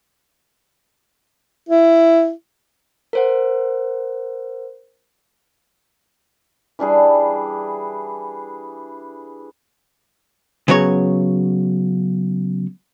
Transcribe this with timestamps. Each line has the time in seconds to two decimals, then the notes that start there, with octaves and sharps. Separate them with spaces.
1.69 E4
3.13 A#4 C5 F#5
6.79 E3 G3 D4 G#4
10.68 C#3 F#3 B3 C#5